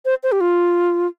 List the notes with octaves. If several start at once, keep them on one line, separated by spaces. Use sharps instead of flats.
C5
C5
G4
F4